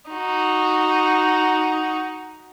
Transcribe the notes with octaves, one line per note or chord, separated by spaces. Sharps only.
D#4 F#4